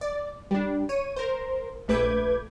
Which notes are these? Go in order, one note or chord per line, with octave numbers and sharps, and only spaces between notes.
D5
G3 D4
C#5 D#7
A#4 C5
A#1 A3 B4 D6 G6 G#6